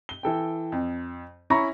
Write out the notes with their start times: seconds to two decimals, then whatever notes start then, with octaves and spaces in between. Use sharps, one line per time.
0.09 G7
0.23 E3 A4 G5
0.72 F2
1.50 C#4 E4 A#5 B5 C#6 A#6